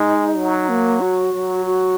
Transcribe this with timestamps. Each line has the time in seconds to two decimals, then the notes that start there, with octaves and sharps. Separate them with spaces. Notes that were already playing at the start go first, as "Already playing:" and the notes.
Already playing: G#3 D#4
0.37 F#3
0.69 A#3
1.01 F#4
1.33 F#3
1.66 F#4